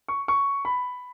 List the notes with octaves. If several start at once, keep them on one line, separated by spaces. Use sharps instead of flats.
C#6
C#6
B5